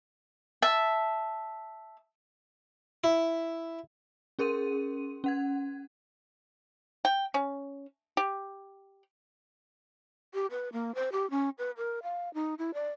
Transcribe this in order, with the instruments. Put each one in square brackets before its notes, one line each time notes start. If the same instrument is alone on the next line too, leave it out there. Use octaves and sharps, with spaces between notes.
[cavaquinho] E5 A5
[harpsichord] E4
[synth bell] C#4 G#4 A#4 C6 D#7
C#4 F#5 G#6
[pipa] G5
C#4
G4
[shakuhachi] G4
B4
A#3
C5
G4
C#4
B4
A#4
F5
D#4
E4
D5